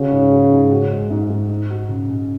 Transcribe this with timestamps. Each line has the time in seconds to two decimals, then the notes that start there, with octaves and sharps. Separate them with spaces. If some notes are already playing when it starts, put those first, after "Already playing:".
Already playing: C#3 F#4
0.12 G#2
0.31 F#4
0.51 G#2
0.71 F#4
0.91 G#3
1.10 G#2
1.30 G#2
1.49 D#4
1.70 F#4
1.89 C#3
2.09 C#3